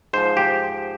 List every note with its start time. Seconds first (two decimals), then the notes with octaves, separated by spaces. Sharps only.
0.13 G#2 F3 C5
0.37 G4